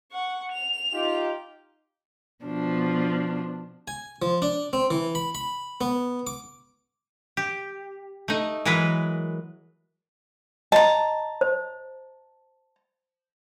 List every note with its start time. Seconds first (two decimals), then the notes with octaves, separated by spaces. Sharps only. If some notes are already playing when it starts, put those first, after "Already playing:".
0.12 F#5 C#6
0.51 F7
0.93 D#4 F4 G4
2.44 B2 F3 D4
3.88 G#5
4.22 F3
4.42 D4
4.73 C4
4.91 E3
5.15 B5
5.35 B5
5.81 B3
6.27 D6
7.37 G4
8.28 A3 D#4
8.65 E3 F#3 G#3 A#4 B4
10.72 D#5 A5 A#5
11.41 C5